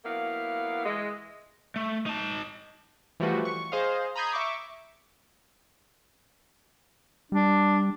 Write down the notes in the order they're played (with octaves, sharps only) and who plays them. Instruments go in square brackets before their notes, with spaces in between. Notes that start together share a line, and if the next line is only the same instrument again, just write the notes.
[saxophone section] F#3 A#3 B3 E4 F5
E3 G#3
[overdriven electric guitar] A3
D#4 A5
[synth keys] E3 F3 G3 A3 F#4 B4
C#6
G#4 C5 D#5 F5
A#5 B5 D#6 G6 G#6 C7
E5 C#6 D6
[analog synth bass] G3 [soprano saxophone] D4